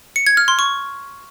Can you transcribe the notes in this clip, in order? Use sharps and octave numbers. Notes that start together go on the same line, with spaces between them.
C#7
G#6
F6
C6
C#6